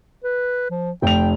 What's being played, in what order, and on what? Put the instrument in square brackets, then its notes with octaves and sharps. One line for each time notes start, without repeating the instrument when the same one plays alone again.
[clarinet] B4
F3
[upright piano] F1 F7 [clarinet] G5